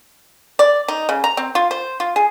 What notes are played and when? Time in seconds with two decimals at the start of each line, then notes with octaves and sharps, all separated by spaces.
0.59 D5
0.88 D#4
1.09 C#3
1.24 A#5
1.37 C4
1.55 F4
1.71 C5
2.00 F4
2.16 G#4